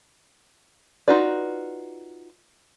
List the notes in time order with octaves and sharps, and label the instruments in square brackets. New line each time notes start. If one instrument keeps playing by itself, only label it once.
[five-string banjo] D#4 F4 F#4 B4 D5